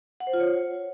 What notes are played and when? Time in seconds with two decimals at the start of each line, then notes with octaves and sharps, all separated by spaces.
0.20 F#5
0.27 C5
0.33 F4
0.40 C#5